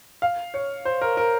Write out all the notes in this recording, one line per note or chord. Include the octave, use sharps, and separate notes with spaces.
F5
C#5
C5
A#4
A#4